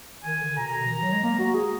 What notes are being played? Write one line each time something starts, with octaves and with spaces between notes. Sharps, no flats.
D#3 G#5
D3
B2 A#5
B2
F3
D#3
F#3
G#3
A#3
F#4
G#4